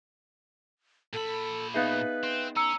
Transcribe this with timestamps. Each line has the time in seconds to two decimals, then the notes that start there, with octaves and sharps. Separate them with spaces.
1.13 A#2 A4 B5
1.74 B3 D#4 G#4 B4 E5 F5
2.23 C4
2.56 C#4 A#5 E6 C#7